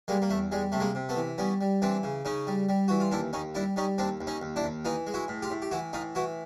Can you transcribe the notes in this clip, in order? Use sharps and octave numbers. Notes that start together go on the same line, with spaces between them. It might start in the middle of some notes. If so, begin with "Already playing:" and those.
G3 G#3 A#3
A#3
E2 A3
G3 G#3
C3 A3
G#3 A#3
C3
A3 B3
E3
G3 B3 C#4
G3
E3 C4 D4
C#3
C#3 C#4 D#4
G3
G3
E3 F#4
F4
D#2 D4 E4
D#2 C#4 D#4
G3 D4 E4
G3 C#4 D#4
D#2 C4 D4
D#2
C#4 D#4
D#2
D4 E4
D#2
E3 D#4 F4
G#3
E4 F#4
A2
F4 G4
A2
G4
E3 E4 F#4
A2 D#4 F4
E3 E4 F#4